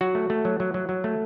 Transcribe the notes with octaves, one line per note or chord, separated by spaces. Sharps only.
F#3 F#4
A3
A3
F#3
F#3
F#3
F#3
A3